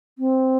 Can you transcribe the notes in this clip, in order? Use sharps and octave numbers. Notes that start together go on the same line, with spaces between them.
C4